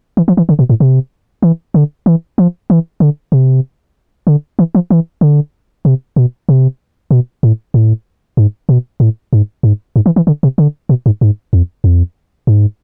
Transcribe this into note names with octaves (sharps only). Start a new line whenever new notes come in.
E3
F3
E3
D3
B2
A2
C3
E3
D3
E3
F3
E3
D3
C3
D3
E3
F3
E3
D3
C3
B2
C3
B2
A2
A2
G#2
B2
A2
G#2
G#2
G#2
E3
E3
D3
C3
D3
B2
G#2
G#2
F2
F2
G#2